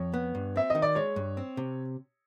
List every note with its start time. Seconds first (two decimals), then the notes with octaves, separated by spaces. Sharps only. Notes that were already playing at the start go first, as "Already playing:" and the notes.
Already playing: F2 C#5
0.14 B3
0.35 G2
0.56 C4 E5
0.70 D#3 D#5
0.82 D5
0.95 G#3 C#5
1.16 G2
1.37 C4
1.57 C3